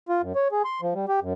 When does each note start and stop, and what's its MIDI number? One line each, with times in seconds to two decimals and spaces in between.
0.09 0.22 65
0.22 0.33 42
0.36 0.48 73
0.52 0.62 68
0.65 0.81 84
0.82 0.94 53
0.94 1.06 55
1.09 1.20 67
1.22 1.33 42